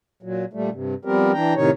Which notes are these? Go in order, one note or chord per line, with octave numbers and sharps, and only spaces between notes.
A#2 F#3
A#2 G3 A3
G2 C3
F3 G3 B3 C4 G4 A#4
E3 D4 G5 A#5
A2 C3 D#3 D#4 C#5